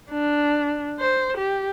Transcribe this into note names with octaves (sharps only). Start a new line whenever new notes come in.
D4
C5
G4